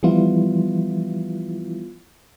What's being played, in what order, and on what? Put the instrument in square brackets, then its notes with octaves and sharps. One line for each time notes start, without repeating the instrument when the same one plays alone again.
[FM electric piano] E3 F3 G3 B3 E4 F4